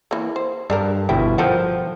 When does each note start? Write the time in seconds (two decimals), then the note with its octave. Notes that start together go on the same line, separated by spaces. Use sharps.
0.11 E3 A#3
0.36 C5
0.70 G2 D4 A4 A#4
1.09 G1 B2 E4 G5
1.38 F3 A4 A#4 F#5 G5 A5